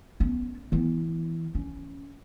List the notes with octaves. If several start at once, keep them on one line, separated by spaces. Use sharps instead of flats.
B3 C#4
E3 B3
C#4